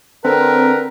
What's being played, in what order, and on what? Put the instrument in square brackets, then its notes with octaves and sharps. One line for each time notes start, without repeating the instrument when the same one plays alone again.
[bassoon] D3 [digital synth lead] C4 [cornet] A#4 [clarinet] B4